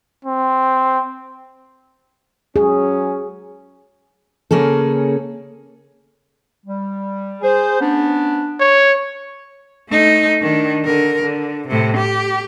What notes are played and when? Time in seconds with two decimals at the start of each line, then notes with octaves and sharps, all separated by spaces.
0.25 C4
2.56 F#3 C#4 G#4
4.51 C#3 A#3 C#4 G#4 A4
6.66 G3
7.42 G#4 C5
7.80 B3 C#4 D4
8.60 C#5
9.89 A3 D#4
10.42 D#3 D4
10.85 D3 A#4
11.23 D3
11.68 A2 C3
11.97 G4